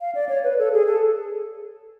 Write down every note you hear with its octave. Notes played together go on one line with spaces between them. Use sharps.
F5
D5
C#5
B4
A4
G#4
A4